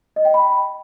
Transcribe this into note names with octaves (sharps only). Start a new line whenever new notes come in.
D#5
G5
B5